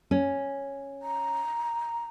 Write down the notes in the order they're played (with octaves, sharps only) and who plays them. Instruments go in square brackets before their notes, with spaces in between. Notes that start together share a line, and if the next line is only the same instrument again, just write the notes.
[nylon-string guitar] C#4
[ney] A#5